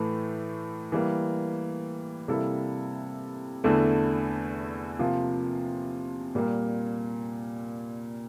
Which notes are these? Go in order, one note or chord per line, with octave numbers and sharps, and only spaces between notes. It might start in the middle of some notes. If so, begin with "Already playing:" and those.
Already playing: A2 E3 A3
E3 G3 A#3
C3 G3 A#3 E4 A4
E2 D3 A3 E4
C3 F3 A#3 F4
A#2 G3 A#3